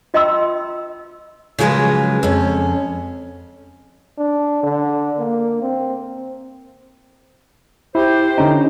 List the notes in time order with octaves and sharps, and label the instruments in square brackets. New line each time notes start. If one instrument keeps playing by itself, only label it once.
[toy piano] F4 D#5 G5 A#5 C6 E6
[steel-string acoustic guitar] C#3 F3 F#3 G#3 A#4 B4
F2 C#4
[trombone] D4
D3
A#3
C4
[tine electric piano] E4 [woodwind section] G4 C5
[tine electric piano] D3 C#4 D#4